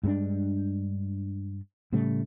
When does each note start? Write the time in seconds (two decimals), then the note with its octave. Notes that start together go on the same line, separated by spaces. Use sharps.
0.03 G2 G#3 C#4 D4
1.93 A2 C#3 G3 A3